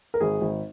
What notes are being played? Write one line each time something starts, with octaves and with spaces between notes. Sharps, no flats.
A#4
G#1 G#4
G#1